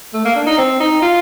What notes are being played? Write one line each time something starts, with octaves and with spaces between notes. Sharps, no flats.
A3
A#3
D4
D#4
C4
D#4
F4